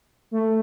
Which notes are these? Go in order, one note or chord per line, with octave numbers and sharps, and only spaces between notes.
A3